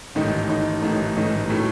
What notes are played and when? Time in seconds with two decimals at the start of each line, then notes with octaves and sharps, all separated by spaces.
0.15 A1 G#2 D#3 A3 D#4
0.49 A1 G#2 D#3 A3 D#4
0.82 A1 G#2 D#3 A3 D#4
1.17 A1 G#2 D#3 A3 D#4
1.50 A2 F#3 A3